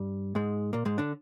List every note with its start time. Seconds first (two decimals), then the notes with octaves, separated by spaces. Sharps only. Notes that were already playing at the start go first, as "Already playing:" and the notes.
Already playing: G2 G3
0.35 G#2 G#3
0.73 A#2 A#3
0.85 G#2 G#3
0.98 D3 D4